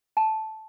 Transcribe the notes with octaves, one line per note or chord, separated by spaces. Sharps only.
A5